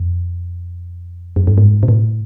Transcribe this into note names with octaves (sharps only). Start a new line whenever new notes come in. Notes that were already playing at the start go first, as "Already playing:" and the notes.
Already playing: F2
F#2
G2
G#2
A#2
A2